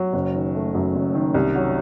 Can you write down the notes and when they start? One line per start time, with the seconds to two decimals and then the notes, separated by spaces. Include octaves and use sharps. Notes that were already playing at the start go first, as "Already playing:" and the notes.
Already playing: F#3
0.13 F#1
0.35 D#3
0.55 A3
0.75 F#2
0.95 F#1
1.15 D#3
1.34 C2
1.55 F#3